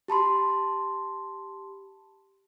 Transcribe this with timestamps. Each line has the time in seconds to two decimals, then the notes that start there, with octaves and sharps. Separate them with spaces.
0.08 G4 A5 B5 C6